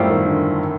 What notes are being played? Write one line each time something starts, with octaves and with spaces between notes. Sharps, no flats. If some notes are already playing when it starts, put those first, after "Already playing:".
Already playing: F#2 A2 G3 C4 F4
D#3
D3